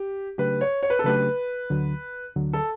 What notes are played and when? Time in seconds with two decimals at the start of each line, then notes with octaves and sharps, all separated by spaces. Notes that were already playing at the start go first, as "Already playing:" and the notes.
Already playing: G4
0.38 C#3 F#3 A3 D4 G4 B4
0.61 C#5
0.83 C#5
0.90 B4
0.99 A4
1.04 C#3 F#3 A3 D4 G4 B4
1.70 D2 D3 F#3
2.36 D2 D3 F#3
2.53 A4